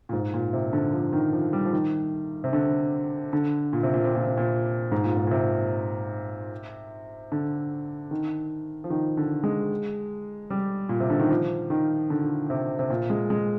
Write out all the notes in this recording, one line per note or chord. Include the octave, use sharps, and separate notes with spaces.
A#2
G#2
A#2
C3
D3
F3
D#3
F3
G3
F3
D#3
C3
D3
D3
A#2
C3
A#2
C3
A#2
C3
A#2
G#2
A#2
G#2
A#2
C3
D3
D#3
F3
D#3
D3
G#3
G3
A#2
C3
D3
D#3
F3
D#3
D3
C3
C3
A#2
G#3
G#3